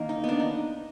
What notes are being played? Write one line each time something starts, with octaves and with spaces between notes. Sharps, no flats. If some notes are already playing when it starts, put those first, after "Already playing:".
Already playing: D#3 A#3
D#4
B3 D4
D#4